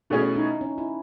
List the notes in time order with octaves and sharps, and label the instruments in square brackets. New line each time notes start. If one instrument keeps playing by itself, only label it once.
[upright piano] B2 A3 C#4 G#4 [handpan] E4
[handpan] D#4
C#4
E4